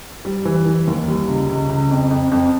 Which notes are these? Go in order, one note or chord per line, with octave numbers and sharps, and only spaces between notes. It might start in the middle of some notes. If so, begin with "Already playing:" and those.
G3
E3
E3
D#2
G3
C#2
C#2
C#2
F2
F2
F2